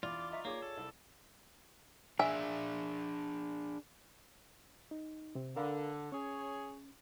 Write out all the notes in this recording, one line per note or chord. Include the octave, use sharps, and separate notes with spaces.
E2 F4 D5
D6
D#5 E5 A#5 C#6
A#3 F4 G#4 C#5 D6
A4
C2
D4 G#4 E5 G#5
D#4
C3 C4
D3 A#4 F5 B5
C#4 G#4 C#5